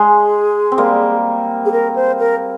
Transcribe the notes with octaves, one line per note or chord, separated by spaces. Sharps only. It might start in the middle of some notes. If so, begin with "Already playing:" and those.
Already playing: G#3 G#4
C4
G3 A#3
G#4
A#4
C5
A#4